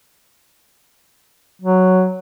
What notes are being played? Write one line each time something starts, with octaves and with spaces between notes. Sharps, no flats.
F#3